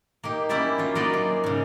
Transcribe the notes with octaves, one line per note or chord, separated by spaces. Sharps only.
A#3 D#4 G4
A#3 C#4 E4 G4 D5 E5
F#3 F4
F#3 A#3 D#4 D5 D#5
G#4
G#2 C#3